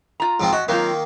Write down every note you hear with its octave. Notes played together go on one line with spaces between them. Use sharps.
F4 A#5
G#2 F3 C4
G#3 F#4
D#3 F#3 A#3 C4 F4